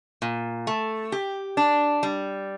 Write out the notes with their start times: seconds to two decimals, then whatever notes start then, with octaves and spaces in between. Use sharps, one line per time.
0.22 A#2
0.67 A3
1.12 G4
1.57 D4
2.03 G3